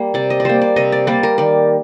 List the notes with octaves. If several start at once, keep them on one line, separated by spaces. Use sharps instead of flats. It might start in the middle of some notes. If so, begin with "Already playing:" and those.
Already playing: G3 A#3
C3 D5
D#5
D5
G3 A#3 C5
D5
C3 D#5
D5
G3 A#3 D5
A#4
D#3 D5